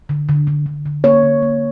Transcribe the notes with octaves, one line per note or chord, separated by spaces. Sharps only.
D3
D3
D3
D3
D3
A#3 C#5
D3
A#3